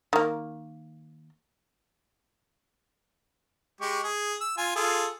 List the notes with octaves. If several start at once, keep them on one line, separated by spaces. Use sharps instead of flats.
D#3 A#3
G#3 G4 C#6
G#4
E6
F4 G#5
F4 G#4 A4